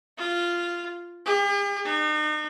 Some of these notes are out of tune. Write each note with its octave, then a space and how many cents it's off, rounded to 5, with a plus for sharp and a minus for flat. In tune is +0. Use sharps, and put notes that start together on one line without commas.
F4 -10
G4 +45
D#4 -40